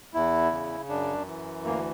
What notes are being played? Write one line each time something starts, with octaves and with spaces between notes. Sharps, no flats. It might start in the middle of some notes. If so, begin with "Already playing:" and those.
E2 E4
C#3
F#2 D4
E3
D2 A#3